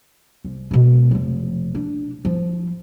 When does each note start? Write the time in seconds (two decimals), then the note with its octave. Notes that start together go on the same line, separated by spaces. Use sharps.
0.44 C2
0.71 B2 G#3
1.11 F1 F3
1.75 D4
2.25 F3